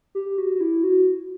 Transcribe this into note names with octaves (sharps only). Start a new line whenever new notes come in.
G4
F#4
F#4
E4
F#4